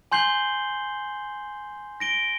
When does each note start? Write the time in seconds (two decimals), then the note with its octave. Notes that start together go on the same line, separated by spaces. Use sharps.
0.12 G#5 C6 G6 C7 F#7 G7
2.00 A#6 D7 G7